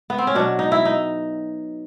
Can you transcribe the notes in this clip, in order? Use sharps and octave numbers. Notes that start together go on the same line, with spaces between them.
B3
C4
C#4
B2 F#3 D4
D#4
E4
D#4